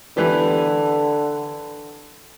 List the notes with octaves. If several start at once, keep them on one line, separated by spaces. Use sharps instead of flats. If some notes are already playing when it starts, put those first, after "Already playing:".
D3 E3 B3 G4